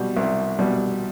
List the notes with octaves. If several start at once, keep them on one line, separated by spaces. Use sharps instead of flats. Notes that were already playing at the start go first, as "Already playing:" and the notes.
Already playing: B2 G3
C2
B2 G3